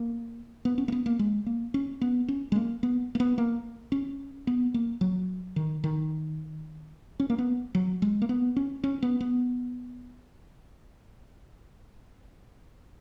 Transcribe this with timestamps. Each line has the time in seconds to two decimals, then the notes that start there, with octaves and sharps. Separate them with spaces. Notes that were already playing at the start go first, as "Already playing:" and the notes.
Already playing: A#3
0.65 B3
0.78 C#4
0.88 A#3
0.92 B3
1.06 A#3
1.19 G#3
1.46 A#3
1.74 C#4
2.01 B3
2.28 C#4
2.52 G#3
2.56 A#3
2.83 B3
3.15 A#3
3.20 B3
3.38 A#3
3.92 C#4
4.47 B3
4.74 A#3
5.01 F#3
5.56 D#3
5.84 D#3
7.20 C#4
7.30 A#3
7.38 B3
7.75 F#3
8.02 G#3
8.22 A#3
8.29 B3
8.56 C#4
8.84 C#4
9.03 B3
9.21 B3